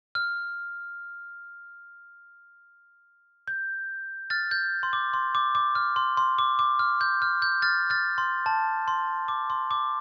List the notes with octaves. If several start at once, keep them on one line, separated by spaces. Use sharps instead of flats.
F6
G6
F6 A6
G6
C6
D6
C6
D6
D6
F6
C6
C6
D6
D6
F6
G6
F6
G6
F6 A6
F6 A6
C6
A5
C6
D6
C6
D6